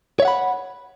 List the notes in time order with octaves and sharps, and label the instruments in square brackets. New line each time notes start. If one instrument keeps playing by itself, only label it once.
[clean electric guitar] C#5
E5
F#5
B5